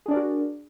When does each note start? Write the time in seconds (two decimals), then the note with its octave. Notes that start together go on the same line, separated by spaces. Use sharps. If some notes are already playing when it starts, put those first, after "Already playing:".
0.06 G#4
0.08 D4
0.11 D5
0.14 A#4
0.16 F#4